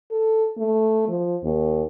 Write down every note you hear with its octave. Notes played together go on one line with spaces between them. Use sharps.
A4
A3
F3
D#2